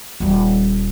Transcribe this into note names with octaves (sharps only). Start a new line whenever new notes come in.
D#1 G3